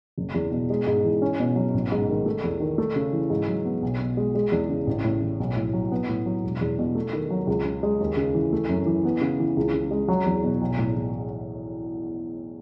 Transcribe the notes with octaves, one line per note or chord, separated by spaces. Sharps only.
F#1
E2
B2
G#3
G#2
E3
C#4
B2
F#3
A1
G#2
D#3
A3
E2
D#3
A3
C#3
E3
G#2
F#3
B3
B1
B2
G#3
G#3
E2
C#3
A1
A2
E3
B1
A2
F#3
B3
A2
F#3
E1
E2
B2
A3
D#3
F#3
C#2
C#3
G#3
D#2
C#3
E3
A3
F#2
E3
B3
C#3
E3
C#2
C#3
G#3
F#3
E2
B2
B1
A2
E3